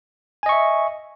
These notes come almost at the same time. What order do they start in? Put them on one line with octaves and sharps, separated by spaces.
G#5 D#5 C#6 E5